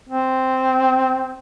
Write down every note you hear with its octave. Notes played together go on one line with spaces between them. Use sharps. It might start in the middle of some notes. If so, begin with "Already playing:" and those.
C4